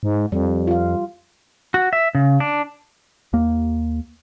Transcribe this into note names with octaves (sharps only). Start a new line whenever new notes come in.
G#2
F2 G3
F4 F5
F#4
E5
C#3
D4
D#2 A#3